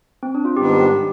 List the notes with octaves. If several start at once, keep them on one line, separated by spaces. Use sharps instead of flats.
C4
D4
F4
G#2 D#3 G3 B3 D4 G4